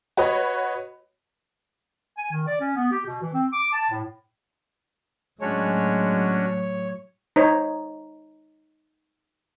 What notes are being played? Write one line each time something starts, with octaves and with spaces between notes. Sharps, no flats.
F#4 B4 C#5 D#5
G#5
D#3
D5
C#4
B3
G4
B2
E3
C4
D6
A5
A2
A2 F#3 G#3 C#4 D4 F#4 C#5
D#4 C5 C#5